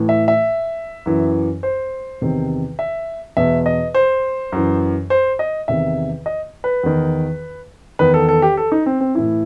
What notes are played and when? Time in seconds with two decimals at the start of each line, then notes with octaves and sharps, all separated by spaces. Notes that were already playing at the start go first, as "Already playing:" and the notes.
Already playing: A2 E3
0.09 E5
0.28 E5
1.06 F#2 E3
1.63 C5
2.21 E2 C3 D#3
2.79 E5
3.37 E2 B2 E5
3.66 D#5
3.95 C5
4.52 F#2 E3
5.10 C5
5.39 D#5
5.68 E2 C3 D#3 E5
6.26 D#5
6.64 B4
6.83 E2 D#3
7.99 E2 D#3 B4
8.14 A4
8.29 A4
8.42 G4
8.57 A4
8.72 D#4
8.86 C4
9.01 C4
9.15 A2 E3 E4